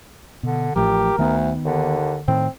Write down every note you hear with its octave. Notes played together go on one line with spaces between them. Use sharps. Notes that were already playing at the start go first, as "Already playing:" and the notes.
B2 D3
A1 A2 F3 G4 A#4
D2 D#3 B3
D#2 D3
A2 D#3 C4